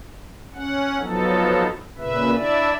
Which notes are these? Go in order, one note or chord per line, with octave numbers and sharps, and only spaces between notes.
C#4 F#5
F3 F#3 B3 D#4 A4
A#2 C#3 B4 E5
D4 E4 D5 E5